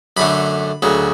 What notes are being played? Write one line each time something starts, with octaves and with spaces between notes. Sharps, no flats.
F#2 D3 A3 B5
D2 C#3 F#3